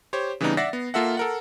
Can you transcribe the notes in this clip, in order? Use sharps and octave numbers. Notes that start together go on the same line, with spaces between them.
G4 C5 C#5
C#3 E3 G3 B3 D4 D#4
D5 E5 F#5 A6 A#6 C7
B3
A#3 F4 A4 E5 F#5
A4 A#4 F#5